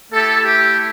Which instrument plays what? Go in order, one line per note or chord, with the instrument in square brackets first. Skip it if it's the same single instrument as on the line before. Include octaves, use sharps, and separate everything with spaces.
[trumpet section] A3 E4 G4 A4
G4